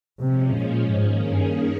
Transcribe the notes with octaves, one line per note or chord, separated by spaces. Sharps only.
C3 F3 G#3 C#4
A#2
G#2 D#3 A#3 C#4 G#4
G2